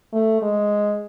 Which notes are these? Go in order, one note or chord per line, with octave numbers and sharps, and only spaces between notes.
A3
G#3